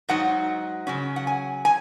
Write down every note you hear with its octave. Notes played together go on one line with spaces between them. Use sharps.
G#2 F#3 D#4 F#5
C#3 F#3 C#4
F#5
G#5
G#5